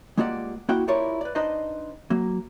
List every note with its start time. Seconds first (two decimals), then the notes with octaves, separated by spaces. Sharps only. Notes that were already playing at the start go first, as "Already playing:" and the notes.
0.18 G#3 A#3 F4 G4 D5 F#5
0.69 A#3 E4 F#4 F#5 G5
0.88 E4 F4 G4 A#4 C#5 D5
1.21 B4 D5
1.35 D4 D#4 B4 C5 D5 D#5
2.10 F#3 A#3